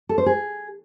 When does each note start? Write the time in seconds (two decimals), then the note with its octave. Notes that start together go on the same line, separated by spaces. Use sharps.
0.09 A4
0.18 C5
0.26 G#4